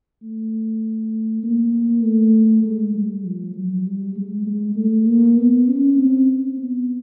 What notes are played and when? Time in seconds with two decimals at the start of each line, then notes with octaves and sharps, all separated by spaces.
0.23 A3
1.43 A#3
2.03 A3
2.64 G#3
2.95 G3
3.25 F3
3.56 F#3
3.86 G3
4.16 G#3
4.46 G#3
4.76 A3
5.07 A#3
5.37 B3
5.68 C#4
5.97 C4
6.58 B3